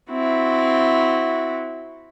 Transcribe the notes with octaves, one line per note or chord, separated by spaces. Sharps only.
C4 E4 F#4